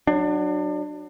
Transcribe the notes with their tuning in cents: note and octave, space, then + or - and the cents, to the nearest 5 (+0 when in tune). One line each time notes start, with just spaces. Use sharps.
F#3 +0 D4 +30